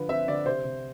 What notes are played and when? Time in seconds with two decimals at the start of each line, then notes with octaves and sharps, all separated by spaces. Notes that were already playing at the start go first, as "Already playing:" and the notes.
Already playing: D3 F3 B4
0.09 C4 E5
0.28 D3 D5
0.46 C3 C5
0.64 C3